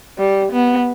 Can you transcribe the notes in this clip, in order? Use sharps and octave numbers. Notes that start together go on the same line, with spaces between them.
G3
B3